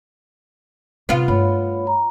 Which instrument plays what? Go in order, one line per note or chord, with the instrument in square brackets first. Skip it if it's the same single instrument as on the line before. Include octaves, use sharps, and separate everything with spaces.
[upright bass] C3 [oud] B3 F4
[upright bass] G2 A3 [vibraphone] C#5 B5
[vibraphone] A#5